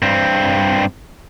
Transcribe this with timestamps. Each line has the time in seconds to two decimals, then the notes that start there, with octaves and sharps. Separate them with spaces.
0.02 G2 C4